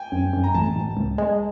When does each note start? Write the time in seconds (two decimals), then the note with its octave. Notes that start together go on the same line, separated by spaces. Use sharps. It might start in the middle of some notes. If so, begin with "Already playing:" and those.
Already playing: G5 G#5
0.12 F#2
0.33 F#2
0.44 A#5
0.55 A1 A5
0.76 A1
0.97 C#2
1.18 G#3